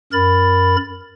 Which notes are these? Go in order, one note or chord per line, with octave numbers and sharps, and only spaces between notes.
F#2 A#4 B5 A6